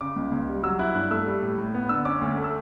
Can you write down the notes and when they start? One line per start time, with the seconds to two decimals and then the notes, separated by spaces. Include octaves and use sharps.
0.01 C#3 D6
0.16 C#2
0.32 C#2
0.48 G3
0.63 F#3 E6
0.79 E4 F#6
0.95 G2 F#6
1.11 A3 E6
1.27 G3
1.42 A2
1.58 A2
1.74 B3
1.89 D3 E6
2.05 C#4 D6
2.21 D2
2.37 A3
2.44 E6